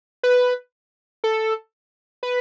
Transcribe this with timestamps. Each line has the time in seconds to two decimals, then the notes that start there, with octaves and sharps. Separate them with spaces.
0.23 B4
1.24 A4
2.23 B4